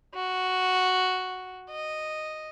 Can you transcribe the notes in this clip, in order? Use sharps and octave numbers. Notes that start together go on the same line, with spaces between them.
F#4
D#5